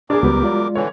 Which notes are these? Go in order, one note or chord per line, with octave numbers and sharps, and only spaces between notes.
E2 D4 G#4 A#4 D6
C#2 F#3 G3 B3
G#3 F4 D5
D3 E3 C#5